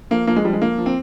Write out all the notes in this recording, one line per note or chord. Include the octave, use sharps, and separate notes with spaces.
F3 A#3
F3 A#3
G#3
F3 G3
G#3
F3 A#3
F3
C4